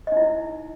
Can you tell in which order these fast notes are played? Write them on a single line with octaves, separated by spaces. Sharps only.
D#5 D#4 E4